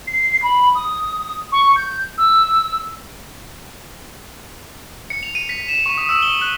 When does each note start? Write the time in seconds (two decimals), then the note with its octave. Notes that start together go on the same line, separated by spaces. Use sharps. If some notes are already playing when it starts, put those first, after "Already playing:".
0.07 C7
0.42 B5
0.75 D#6
1.52 C#6
1.76 G6
2.17 E6
5.10 C#7
5.23 F7
5.35 D#7
5.49 B6
5.69 E7
5.86 C#6
5.98 D#6
6.09 E6
6.22 G7
6.41 F#6